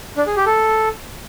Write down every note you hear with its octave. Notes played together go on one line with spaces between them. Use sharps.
D4
G#4
G4
A4